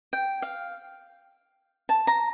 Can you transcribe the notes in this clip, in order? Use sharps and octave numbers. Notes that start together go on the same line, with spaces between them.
G5
F5
A5
A#5